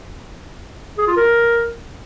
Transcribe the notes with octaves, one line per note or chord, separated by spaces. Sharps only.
G#4
F4
A#4